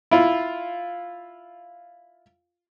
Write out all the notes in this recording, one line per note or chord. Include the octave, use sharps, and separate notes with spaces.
E4 F4